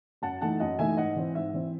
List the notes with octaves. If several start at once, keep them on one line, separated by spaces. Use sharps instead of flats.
F#2 F#5 A5
E3 A3 D#4 F#5 A5
F#2 D#5 F#5
E3 A3 D#4 E5 G#5
G#2 D#5 F#5
E3 C4
G#2 E5
E3 C4